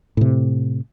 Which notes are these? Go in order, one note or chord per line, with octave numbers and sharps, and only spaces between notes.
A2 C3